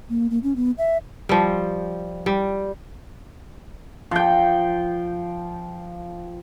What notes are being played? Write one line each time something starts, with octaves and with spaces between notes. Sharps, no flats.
A#3
A#3
C#4
B3
E5
F3 G3
G3
F3 G5